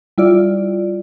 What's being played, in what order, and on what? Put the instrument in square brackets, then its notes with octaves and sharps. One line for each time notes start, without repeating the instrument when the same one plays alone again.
[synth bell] G3 E4 F4 D5